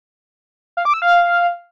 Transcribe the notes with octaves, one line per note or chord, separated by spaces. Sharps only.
F5
D6
E6
F5